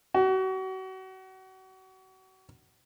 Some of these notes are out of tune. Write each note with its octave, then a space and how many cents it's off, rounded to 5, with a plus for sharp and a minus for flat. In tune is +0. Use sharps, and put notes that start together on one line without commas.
F#4 +35